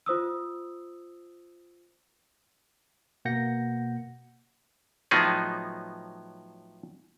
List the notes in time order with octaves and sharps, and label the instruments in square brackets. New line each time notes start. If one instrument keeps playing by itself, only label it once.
[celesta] F4 C5 D#6 E6
[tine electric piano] B2 A#3 F#5 G6 A#6 C#7
[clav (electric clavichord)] A2 F3 F#3 B3 D#4 G#4